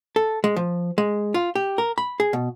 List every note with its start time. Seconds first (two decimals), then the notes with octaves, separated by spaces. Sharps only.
0.16 A4
0.44 G#3
0.56 F3
0.98 G#3
1.34 F4
1.55 G4
1.78 A#4
1.98 B5
2.20 G#4
2.33 B2